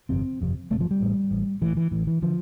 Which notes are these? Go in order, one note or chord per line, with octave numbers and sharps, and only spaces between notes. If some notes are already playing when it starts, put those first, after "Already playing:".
G1 F2 C3 C4
G1 F2 C3
G1 F2 C3 A3
F3
G3
A1 A2
A1 A2
A1 A2 E3
E3
A1 A2 E3
E3
D3 F3